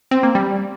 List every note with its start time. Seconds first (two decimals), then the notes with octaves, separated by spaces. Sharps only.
0.11 C4
0.23 A#3
0.35 G3